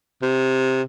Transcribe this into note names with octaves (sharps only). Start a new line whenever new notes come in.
C3